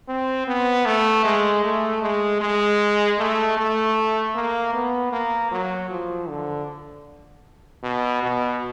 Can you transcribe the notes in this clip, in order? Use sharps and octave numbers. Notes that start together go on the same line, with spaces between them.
C4
B3
A3
G#3
A3
G#3
G#3
A3
A3
A#3
B3
A#3
F#3
F3
D3
B2
B2